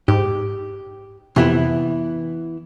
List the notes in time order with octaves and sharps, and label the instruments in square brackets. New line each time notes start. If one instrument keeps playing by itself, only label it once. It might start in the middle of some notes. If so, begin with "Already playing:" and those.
[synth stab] G#2 [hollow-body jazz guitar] G4
[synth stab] F2 C3 [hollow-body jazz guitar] E3 B3 E4